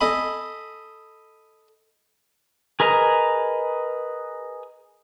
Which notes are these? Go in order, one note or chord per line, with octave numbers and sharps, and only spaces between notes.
A4 D#5 G#5 B5
G#4 A#4 B4 D#5 A#5